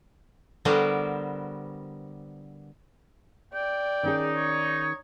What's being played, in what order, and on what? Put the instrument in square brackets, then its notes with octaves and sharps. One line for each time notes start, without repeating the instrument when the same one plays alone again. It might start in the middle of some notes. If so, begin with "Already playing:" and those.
[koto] D3 G3 B3 F#4 A#4 C5
[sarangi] D5 [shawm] G5
[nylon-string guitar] D#3 C#4 G#4 [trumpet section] D#4
[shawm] C#5